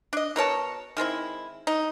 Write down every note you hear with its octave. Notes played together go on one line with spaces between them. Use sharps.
D4 D#5
B2 A#4 C#5 A5
D#3 G#3 C4 E4
D#4